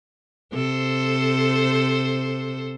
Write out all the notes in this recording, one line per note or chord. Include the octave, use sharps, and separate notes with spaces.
C3 A4 C5